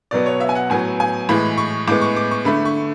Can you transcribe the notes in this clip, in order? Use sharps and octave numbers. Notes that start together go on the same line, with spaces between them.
B2 F#3 B3 D5
C#5
E5
G#5
F#5
A2 F#3 B3 G#5
G#5
A2 E3 G#3 B5
C#6
A2 G#3 B3 D6
C#6
D6
C#6
D3 A3 B5
C#6